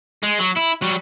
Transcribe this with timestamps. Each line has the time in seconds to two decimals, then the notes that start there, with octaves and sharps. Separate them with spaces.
0.23 G#3
0.40 F#3
0.57 E4
0.82 F#3 G3